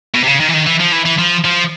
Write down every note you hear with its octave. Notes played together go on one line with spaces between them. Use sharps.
B2
C3
C#3
D#3
E3
D#3
E3
F3
E3
E3
F3
F3